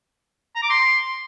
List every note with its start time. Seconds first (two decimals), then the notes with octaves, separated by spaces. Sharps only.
0.56 A#5
0.63 D6
0.70 C6